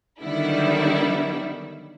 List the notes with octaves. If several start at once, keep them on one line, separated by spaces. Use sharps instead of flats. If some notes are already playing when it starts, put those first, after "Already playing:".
D3 D#3 F#3 G3 B3 E4